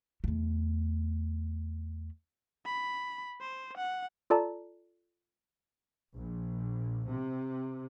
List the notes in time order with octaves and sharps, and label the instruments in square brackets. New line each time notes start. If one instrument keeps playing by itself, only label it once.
[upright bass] E2 A3
[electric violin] B5
C5
F#5
[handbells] F4 A4 D5 A5 A#5
[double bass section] A#1
C3